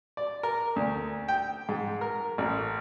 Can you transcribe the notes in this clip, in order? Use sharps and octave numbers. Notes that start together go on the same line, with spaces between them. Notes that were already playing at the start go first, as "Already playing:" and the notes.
D5
A#4
D2
G5
G#2
A#4
A1